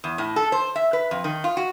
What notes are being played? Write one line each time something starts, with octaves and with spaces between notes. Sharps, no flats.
E2
A2
A4
C5
E5
B4
F2
D#3
F4
F#4